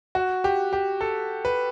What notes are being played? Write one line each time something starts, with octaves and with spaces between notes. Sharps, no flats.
F#4
G4
G4
A4
B4